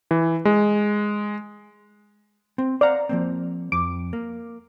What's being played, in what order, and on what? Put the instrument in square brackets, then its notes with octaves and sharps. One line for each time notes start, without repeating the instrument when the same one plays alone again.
[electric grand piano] E3
G#3
[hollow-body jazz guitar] C4
[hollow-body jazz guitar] C5 F5 F#5 [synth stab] D5 A#5
[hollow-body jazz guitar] F3 A#3 C4
[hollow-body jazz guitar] F2 [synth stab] D6
[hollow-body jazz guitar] A#3